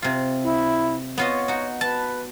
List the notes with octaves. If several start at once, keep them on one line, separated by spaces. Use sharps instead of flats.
C3 F4
E4
B3 F4 C#5 D#5
D#4 F#4
B4 A5